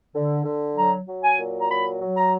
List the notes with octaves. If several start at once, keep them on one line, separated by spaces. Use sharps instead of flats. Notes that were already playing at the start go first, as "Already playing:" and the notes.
D3
D3
F#3 A#5
F#3
G#5
A#2
A#5
F#3 B5
F#3
A#5